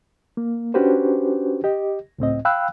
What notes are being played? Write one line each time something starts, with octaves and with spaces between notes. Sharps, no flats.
A#3
C#4 D4 F#4 G4 B4 C5
G4 D#5
C#2 A2 C4 D#5
F5 G5 B5 E6 F#6